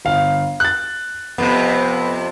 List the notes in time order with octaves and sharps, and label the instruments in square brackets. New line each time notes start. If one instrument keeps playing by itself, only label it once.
[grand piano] G1 F5
F#6 A6
[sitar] F2 C3 [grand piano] B3